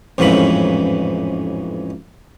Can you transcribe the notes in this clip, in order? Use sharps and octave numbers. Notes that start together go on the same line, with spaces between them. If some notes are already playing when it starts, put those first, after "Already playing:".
A1 F2 G#2 C#3 E3 B5